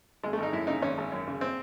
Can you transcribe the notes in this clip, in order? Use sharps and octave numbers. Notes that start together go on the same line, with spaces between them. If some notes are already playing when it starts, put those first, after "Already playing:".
G#1 G#3
A3
G#1 D#4
F#2 E4
C#3 D#4
G#1 C#4
G#1
F#2
C#3
C4